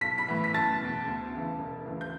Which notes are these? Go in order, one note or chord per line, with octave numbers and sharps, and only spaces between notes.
B1 B6
B5 B6
A2 E3
B6
F#1 A5 A6
E2 B2
D2
C#3 E3
E1
D2 C#3 E3
G6